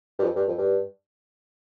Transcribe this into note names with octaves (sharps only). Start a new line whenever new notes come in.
G2
F2
G2
F2
G2